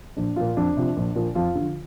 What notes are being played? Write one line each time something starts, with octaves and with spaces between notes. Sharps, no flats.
A#1 D4
A#2 F3 F4
F2 D4
C3 F3
A#1
A#2 F3
F2 F4
D3 F3